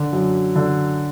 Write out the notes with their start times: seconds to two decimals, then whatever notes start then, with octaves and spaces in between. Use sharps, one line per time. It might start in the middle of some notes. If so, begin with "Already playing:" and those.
Already playing: D3
0.12 F#2
0.55 D3